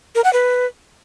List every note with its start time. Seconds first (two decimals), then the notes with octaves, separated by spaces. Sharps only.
0.15 A#4
0.24 F#5
0.33 B4